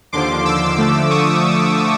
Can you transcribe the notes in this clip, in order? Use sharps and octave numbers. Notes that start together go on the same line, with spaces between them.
D#2 D3 F3 C6 D6
D6 E6
D3 F3 A3
C#6 D#6